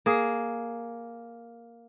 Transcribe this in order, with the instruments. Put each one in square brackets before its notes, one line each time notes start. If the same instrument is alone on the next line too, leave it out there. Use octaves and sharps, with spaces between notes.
[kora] A#3 G#4